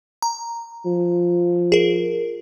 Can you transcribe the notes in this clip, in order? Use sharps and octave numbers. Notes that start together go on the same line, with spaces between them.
A#5
F3
G#4 A#4